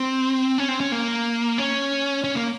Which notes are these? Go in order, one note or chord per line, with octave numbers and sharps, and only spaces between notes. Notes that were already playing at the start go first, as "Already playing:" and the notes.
Already playing: C4
C#4
C4
C#4
A#3
C#4
C#4
A#3